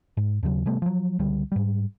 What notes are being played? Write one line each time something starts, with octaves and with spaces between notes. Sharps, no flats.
G#2
D#2 C#3 F#3
C3 G3 A3 B3
F3 F#3
C#2 D3 G3
G#2 G3